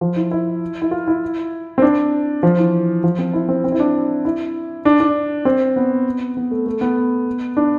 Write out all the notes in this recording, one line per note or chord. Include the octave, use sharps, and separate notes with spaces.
F3
E4
E4
E4
F4
E4
C4
D4
F3
E3
F3
C4
E4
C4
C4
E4
D4
E4
D4
D4
C4
B3
B3
A3
A3
B3
D4